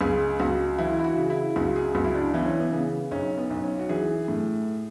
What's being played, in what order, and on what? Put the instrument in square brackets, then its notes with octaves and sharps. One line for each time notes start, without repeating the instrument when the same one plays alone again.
[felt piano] C#2 G#4
C#2 F#4
E3 E4
E4
F#4
C#3
E4
C#2 F#4
G#4
C#2 F#4
E4
D4
E3 B3
C#4
B3
C#3 B3
B1 C#4
B3
B1
C#4
F#4
E3 G#4
A2